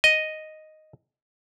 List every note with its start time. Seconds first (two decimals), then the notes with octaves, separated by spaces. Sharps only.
0.04 D#5